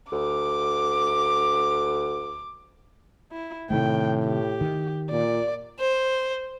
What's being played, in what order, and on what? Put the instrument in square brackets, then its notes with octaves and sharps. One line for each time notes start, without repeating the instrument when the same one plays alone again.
[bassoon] D2 [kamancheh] D6
[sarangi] E4
[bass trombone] A2 [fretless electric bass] C3 D#3 A3 [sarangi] G5
[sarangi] G4
[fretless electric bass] D#3
[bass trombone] A#2 [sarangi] D5
[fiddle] C5